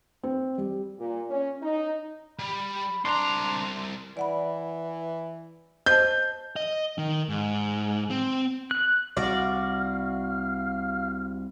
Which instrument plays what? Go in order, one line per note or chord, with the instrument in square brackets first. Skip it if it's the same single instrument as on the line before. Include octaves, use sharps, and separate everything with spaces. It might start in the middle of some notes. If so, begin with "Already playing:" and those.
[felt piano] C4
G3
[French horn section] A#2
C#4
D#4
[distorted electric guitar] G3 [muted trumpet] B5
[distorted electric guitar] C2 A#5 [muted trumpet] D4 [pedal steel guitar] C6
[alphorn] E3 [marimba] D5 F#5 B5
[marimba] C5 D#5 A5 [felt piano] G6
[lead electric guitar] D#5
D#3
G#2
C4
[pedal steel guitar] F#6
[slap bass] C2 [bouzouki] F#4 D5 [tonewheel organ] F5